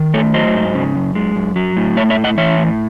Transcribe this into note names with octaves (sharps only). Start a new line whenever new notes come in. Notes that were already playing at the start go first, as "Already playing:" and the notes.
Already playing: D#3
A3 A4 C#5
F#3 C5 D#5
G#2
C#3
F#2
G#3
F#2
F#3
A2
A3 C#5 E5
C#5 E5
A2
D#5 F#5
E3 C#5 E5
A2